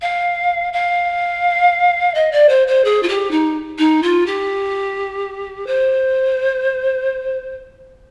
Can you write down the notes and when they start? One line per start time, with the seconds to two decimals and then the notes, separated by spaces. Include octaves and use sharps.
0.01 F5
0.72 F5
2.14 D#5
2.31 D5
2.48 C5
2.67 C5
2.84 G#4
3.02 F4
3.08 G4
3.31 D#4
3.78 D#4
4.02 F4
4.26 G4
5.66 C5